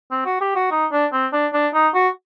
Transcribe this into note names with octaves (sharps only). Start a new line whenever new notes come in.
C4
F#4
G4
F#4
D#4
D4
C4
D4
D4
D#4
F#4